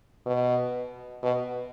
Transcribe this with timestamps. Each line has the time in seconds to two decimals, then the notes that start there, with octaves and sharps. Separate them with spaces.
0.26 B2
1.23 B2